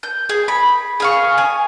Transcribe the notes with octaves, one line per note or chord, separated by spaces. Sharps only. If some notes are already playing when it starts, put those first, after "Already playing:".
G6
G#4
B5
G#4 F5 C#6
G#5